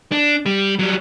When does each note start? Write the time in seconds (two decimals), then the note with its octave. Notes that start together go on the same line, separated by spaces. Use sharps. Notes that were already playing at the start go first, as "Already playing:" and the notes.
0.12 D4
0.46 G3
0.79 F#3 G3